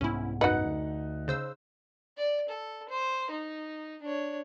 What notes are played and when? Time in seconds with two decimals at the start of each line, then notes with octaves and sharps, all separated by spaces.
0.01 C2 G#2 B3 C#4 E4
0.41 F#2 D#4 F#4 B4 F#5 F#6
0.65 D2
1.28 C#3 C5 E6
2.18 D5
2.49 A4
2.89 C5
3.30 D#4
4.02 D4 C#5